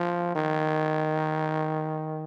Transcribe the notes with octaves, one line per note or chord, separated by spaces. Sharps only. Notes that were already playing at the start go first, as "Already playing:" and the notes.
Already playing: F3
D#3